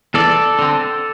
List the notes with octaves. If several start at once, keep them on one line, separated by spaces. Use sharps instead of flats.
E2 A4 D5
D3 C4